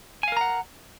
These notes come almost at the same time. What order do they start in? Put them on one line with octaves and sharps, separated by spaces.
G#5 F5 A#4 A#5 F#5